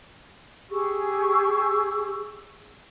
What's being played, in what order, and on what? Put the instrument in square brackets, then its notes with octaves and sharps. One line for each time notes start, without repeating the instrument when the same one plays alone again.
[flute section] G4 G#4 C#6 E6